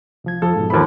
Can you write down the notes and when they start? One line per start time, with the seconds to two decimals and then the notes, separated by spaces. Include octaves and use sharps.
0.24 C2 F3 G#6
0.42 F2 F3 A4
0.56 G#2 B2
0.70 D#2 F3 B5